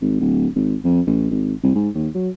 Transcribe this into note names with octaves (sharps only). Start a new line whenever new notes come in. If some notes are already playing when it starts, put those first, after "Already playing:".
G#1
D1
G#1
F2
A1
G#1
C2
G#2
D#2
F#3